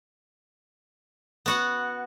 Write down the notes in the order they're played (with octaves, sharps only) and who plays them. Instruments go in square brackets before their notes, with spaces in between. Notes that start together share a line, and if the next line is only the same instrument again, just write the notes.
[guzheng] B3 F#4 F#5